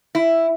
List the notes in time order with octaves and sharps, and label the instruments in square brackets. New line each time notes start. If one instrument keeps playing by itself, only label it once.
[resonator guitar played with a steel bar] E4